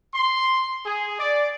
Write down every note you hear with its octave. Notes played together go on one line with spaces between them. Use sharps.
C6
G#4
D5